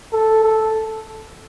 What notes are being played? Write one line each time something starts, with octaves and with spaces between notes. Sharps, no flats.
A4
A4